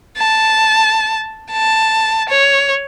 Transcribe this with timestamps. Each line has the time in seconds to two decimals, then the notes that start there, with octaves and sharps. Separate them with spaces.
0.18 A5
1.52 A5
2.29 C#5